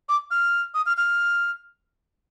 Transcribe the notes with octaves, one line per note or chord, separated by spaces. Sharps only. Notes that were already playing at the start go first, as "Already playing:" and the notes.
D6
F6
D#6
F6
F6